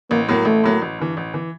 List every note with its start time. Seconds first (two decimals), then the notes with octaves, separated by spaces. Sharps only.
0.11 A1 A#3
0.29 A2 F#3 A#3
0.45 A1 A3
0.63 A2 F#3 A#3
0.82 A1
0.99 G2 E3
1.17 A1
1.34 E3